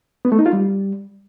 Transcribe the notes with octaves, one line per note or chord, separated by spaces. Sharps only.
B3
A3
D#4
F4
G3